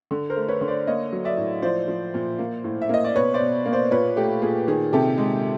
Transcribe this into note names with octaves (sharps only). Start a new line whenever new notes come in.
D3
A#4 C5
A3
B4 C#5
D3
C5 D5
A#3 C#5 D#5
F#3
D5 E5
A2
F3 C5 D5
F3
A#2
A#3
A2
E5
A#3 D#5
D5
B2 B4 C#5
C5 D5
B2
A#3
C5 D5
A#2 B4 C#5
A3 G4
A#2 G#4
D#3 G#4
C3 G4 A4
G#3 G#4